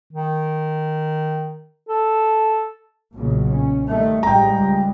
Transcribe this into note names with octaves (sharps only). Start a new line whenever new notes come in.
D#3
A4
B1 A#2 C#3 F#3
C#4
D#3 G3 A3
A1 G#2 G3 G#3 G5 A#5
C#2